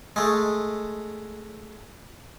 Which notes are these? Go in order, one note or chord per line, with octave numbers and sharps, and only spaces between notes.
G#3 A3